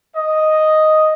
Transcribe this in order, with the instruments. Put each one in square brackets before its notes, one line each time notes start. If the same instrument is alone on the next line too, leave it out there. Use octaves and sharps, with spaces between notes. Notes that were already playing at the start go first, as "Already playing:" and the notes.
[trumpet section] D#5